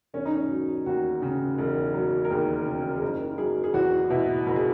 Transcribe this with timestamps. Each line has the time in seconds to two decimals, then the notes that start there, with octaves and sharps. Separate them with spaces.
0.14 E1 C#4
0.26 D#4
0.35 C#4
0.50 F#3
0.86 D#2 F#4
1.22 C#3
1.58 E1
1.94 F#3
2.25 A#4
2.30 D#2 G#4
2.66 C#3
2.96 G#4
3.02 F#1 A#4
3.38 F#3 G#4
3.64 G#4
3.74 E2 F#4
4.10 B2 E4
4.46 F#1 F#4
4.56 G#4